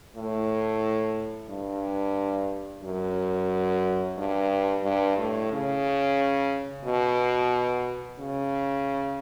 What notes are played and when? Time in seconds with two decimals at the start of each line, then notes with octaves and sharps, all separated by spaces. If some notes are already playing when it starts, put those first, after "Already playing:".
0.16 A2
1.49 G2
2.83 F#2
4.18 G2
4.84 G2
5.18 A2
5.52 C#3
6.85 B2
8.19 C#3